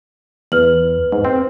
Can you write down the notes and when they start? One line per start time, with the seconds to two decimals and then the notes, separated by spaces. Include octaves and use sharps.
0.52 E2 B4 F6 F#7
1.12 G#2
1.25 C4